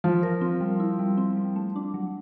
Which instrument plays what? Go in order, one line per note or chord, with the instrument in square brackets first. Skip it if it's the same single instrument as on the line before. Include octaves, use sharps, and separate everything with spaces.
[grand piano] F3 [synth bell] F4
[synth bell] A#4
C4
G3
E4
G3
C4
G3
A3
D4
F#3